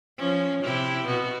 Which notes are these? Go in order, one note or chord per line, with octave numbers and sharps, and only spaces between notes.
F3 C#4
C3 E4 G4
B2 B3 F#4